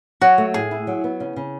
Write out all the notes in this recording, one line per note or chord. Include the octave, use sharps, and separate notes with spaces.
F#3 F#4
A3
A2 G#4
E4
F#3
B3
C#3
C#3